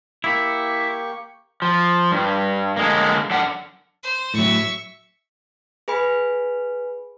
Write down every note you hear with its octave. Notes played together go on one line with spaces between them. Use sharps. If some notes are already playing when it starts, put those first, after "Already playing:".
A#3 E4 G4 C#6
F3
G2
D3 G#3 A#3
F#2 D4 F#5
C5
A2 F#3 E5 C#6
G#4 B4 G#5 B5